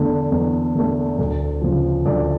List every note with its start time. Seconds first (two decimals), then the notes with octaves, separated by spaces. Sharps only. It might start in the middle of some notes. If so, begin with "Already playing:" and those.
Already playing: E2 D3 A3
0.32 E2
0.75 D3 A3
1.19 D2
1.62 C#3 F3
2.06 D2 D5